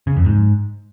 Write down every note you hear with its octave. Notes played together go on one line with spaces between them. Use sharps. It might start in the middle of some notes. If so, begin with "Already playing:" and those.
C#3
F2
G#2